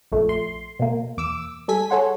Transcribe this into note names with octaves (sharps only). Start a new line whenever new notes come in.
A#1 F2 A#2 A3
C6
B2 A#3
E2 D6 E6
G3 A4 G#5 B6
G#4 A4 C#5 F#5 C6